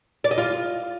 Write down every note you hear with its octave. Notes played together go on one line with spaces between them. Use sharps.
D5
D#5
F4